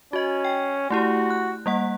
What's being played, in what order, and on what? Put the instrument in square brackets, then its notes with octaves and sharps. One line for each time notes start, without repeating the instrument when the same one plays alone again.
[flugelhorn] C#4 [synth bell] F#4 D#5
[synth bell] G5
[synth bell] A3 E4 G4 [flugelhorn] F#4
[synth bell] F#6
G3 A#3 F#5